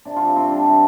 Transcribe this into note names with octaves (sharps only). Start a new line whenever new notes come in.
C3 D4
G3 F4
C4
C3 C4
G3 D4
C3